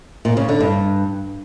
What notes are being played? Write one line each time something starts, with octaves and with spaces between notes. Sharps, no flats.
A#2
C#3
D3
G2